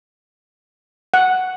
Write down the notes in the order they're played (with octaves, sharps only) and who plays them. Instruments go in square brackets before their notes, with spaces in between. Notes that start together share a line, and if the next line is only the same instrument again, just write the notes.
[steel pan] F#5